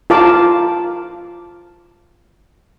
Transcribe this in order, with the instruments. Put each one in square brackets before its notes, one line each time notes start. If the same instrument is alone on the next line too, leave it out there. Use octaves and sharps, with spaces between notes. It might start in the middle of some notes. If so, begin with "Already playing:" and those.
[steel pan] F4 A#4 F5 A5 D6